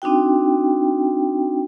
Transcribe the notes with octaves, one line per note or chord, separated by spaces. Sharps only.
C4 D4 D#4 F#4 G5